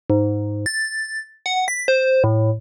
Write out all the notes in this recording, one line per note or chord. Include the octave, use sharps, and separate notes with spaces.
G#2
A6
F#5
B6
C5
A2